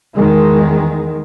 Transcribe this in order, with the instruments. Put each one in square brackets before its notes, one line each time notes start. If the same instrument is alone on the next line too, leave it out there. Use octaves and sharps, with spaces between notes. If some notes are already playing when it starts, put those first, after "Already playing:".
[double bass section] E2 D#3 G#3